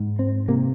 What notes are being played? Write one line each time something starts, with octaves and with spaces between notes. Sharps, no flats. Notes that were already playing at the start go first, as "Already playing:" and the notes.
Already playing: G#2
C4
C3 A#3